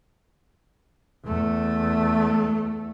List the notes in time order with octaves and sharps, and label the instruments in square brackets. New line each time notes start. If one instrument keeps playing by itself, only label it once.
[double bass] E2 A3